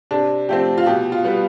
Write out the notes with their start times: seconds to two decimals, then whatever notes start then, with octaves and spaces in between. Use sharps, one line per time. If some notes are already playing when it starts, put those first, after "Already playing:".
0.11 C3 D4
0.49 F3 A3 C4 G4
0.78 F4
0.86 B2 G4
1.12 F4
1.25 G3 B3